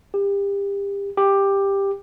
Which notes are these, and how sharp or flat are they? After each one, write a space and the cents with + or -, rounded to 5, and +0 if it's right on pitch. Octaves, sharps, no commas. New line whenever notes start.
G4 +30
G4 +10